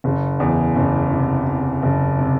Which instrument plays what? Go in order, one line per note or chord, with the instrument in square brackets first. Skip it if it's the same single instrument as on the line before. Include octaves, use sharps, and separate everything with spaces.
[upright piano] F#1
E2
F#1
C3
C3
F#1
C3